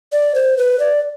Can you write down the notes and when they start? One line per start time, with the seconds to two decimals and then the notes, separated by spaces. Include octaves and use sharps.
0.12 D5
0.35 C5
0.58 B4
0.80 D5